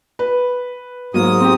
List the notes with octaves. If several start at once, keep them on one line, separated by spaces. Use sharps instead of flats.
B4
G#2 F#3 A#3 D#6
C4 G4